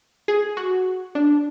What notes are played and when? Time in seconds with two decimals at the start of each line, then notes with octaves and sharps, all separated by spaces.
0.28 G#4
0.57 F#4
1.15 D4